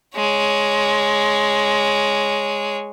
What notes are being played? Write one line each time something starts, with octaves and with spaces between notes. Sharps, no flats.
G#3 C#5